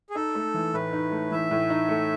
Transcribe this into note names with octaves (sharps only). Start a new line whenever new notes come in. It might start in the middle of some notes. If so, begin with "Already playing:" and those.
G#4
D#4 A4
A3
E3
A2 B4
D#4
A3
E3 E5
A2
D#4
A3